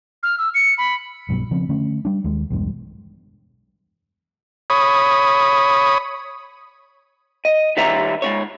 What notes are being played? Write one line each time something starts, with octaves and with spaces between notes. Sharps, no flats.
F6
E6
C#7
B5
B1 G2 B2 F#3
C#3 F3 C4 C#4
D3 A3 C#4
G3 D4
D#2 G#3
B1 E2 G2 G#3
C#5 B5 D#6
D#5
D#3 G3 B4 C#5 E5 A#5
G#2 C3 C#5